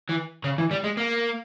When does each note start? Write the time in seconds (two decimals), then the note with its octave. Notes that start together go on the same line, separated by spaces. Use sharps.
0.09 E3
0.44 C#3
0.58 E3
0.71 G3
0.84 G#3
0.97 A#3